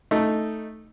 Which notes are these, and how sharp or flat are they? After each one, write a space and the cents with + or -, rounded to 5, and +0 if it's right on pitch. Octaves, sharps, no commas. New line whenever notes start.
A3 +0 D#4 +0